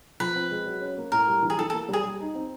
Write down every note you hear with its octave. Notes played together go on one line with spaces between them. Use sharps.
F3 B4
C4
G#3
F#3
C#4
A#3
A2 A#4
G3
E3
G#4
E3 A4
A4
A#3
G3 G#4
G3
D#4
C4